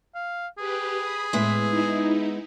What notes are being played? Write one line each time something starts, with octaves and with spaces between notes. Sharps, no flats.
F5
G4 G#4 B4
B5 D#6
A2 G#3 B3 E5
D#4 E4